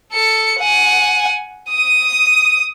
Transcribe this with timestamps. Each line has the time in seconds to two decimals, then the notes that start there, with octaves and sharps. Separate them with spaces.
0.12 A4 C#7
0.59 F#5 G#5
1.70 D#6 D#7